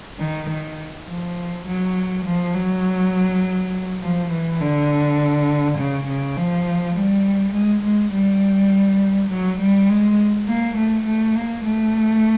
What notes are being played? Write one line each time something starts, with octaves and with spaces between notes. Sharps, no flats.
D#3
D#3
F3
F#3
F3
F#3
F3
E3
D3
C#3
C#3
F3
G3
G#3
G#3
G3
F#3
G3
G#3
A#3
A3
A3
A#3
A3